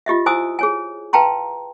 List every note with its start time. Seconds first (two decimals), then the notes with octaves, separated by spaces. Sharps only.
0.06 F4 G4 D#5 E5
0.26 E4 C5 G#5 D#6 E6
0.59 G#4 C#5 G#5
1.13 B4 F5 G5 A5 A#5 C6